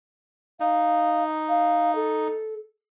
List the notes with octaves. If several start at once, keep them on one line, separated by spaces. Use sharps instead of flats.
D#4 F5
F5
A4